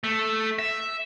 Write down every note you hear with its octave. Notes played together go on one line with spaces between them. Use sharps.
A3
E5